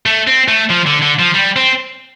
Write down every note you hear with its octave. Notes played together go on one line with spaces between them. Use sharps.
A3
C4
A3
F3
D3
D3
F3
G3
C4